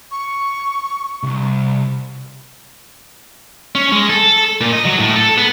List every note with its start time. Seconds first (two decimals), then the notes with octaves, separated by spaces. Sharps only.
0.11 C#6
1.23 C2
3.75 C#4
3.92 G#3
4.09 A4
4.61 A#2
4.73 D#5
4.86 F#3
4.99 A2
5.16 A4
5.38 B3